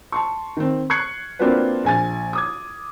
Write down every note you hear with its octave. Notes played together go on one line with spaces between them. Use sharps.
A5 C6 C#6
D#3 C4
C#6 F#6 G#6 C7 C#7
A#3 C4 D4 F4 F#4 B4
A#1 G#5 A6
D6 D#6 G#6